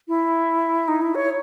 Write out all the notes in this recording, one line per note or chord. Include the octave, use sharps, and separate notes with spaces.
E4
D#4
E4
C#5